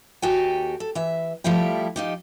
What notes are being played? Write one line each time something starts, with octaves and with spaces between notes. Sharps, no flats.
D#2 F#4 G4 A4 G5 G#5
A4
E3 E5
F3 G3 A3 E4 G4
F3 D#4 G4